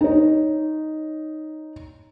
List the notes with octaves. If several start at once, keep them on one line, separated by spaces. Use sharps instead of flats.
D#4 C#5